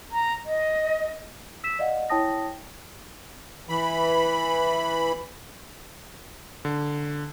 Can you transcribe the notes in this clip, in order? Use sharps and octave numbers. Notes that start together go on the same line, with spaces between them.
A#5
D#5
E6 B6 E7
D5 D#5 F5 F#5
E4 C#5 G5 A5 D#6 A#6
E3 B5
D3